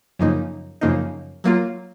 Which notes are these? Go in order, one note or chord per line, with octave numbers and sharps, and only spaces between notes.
F#2 C#3 F3 A#3 D#4
F#2 C#3 F3 A#3 D#4
F#3 A#3 F4